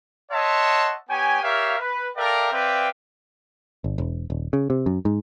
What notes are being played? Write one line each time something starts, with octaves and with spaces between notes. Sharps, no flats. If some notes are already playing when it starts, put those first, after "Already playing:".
C#5 D#5 E5 F#5 A5 C6
B3 G4 C#5 G5 G#5
G4 A#4 C#5 E5 F5
B4
A4 A#4 D5 E5 F5 G5
C4 B4 D5 E5 F5 G5
G1
E1
D#1
C#3
C3
F#2
G#2